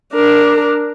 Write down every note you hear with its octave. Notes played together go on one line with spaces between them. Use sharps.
D4 A#4